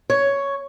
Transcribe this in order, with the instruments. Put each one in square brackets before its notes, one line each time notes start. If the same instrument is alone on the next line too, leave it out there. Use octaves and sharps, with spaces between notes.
[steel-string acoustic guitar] C#5